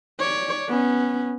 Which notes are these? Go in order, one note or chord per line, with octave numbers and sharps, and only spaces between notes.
C#5 D5
B3 C#4